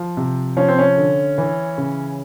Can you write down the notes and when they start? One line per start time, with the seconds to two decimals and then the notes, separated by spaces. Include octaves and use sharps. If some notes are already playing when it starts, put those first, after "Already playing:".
Already playing: F3
0.17 C3
0.56 F3 C#4
0.68 C4
0.79 C#4
0.97 D3
1.38 E3
1.78 C#3